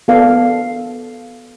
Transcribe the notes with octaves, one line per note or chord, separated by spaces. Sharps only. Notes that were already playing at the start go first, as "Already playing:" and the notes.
B3 A4 D5 F5